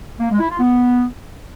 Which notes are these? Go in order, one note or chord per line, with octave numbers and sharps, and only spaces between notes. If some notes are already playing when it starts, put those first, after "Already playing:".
A#3
G#3
E4
F4
B3